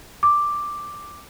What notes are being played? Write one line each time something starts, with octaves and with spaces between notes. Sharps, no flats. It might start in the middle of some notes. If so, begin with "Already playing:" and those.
D6